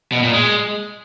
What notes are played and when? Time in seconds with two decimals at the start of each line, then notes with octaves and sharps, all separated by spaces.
0.12 B2
0.23 A#2
0.33 G#3